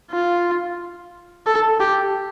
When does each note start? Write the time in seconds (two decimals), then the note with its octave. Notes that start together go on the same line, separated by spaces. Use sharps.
0.12 F4
1.47 A4
1.80 G4